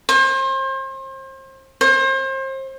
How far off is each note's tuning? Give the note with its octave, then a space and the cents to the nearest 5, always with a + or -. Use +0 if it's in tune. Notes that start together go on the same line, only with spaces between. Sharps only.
C5 +35
C5 +35